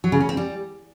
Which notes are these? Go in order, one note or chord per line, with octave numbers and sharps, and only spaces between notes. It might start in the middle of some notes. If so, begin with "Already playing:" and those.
F#3
C#3
C#4
C4
G3